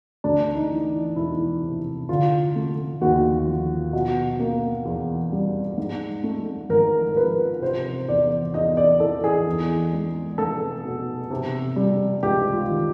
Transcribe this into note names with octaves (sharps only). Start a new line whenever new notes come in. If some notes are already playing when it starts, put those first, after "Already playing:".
D2 D4
D#4
E3
E1 E4
C3
D3 F4
A3
D#2 F#4
F3
B2
A#3
E2
G3
G#2
A3
G#1 A#4
A#4
F3 B4
C3 C5
E2 D5
E2 D#5
D5
E3 A4
G#4
E2
G#3
F1 A4
B2
C3
G3
C#2 G4
F4
D#3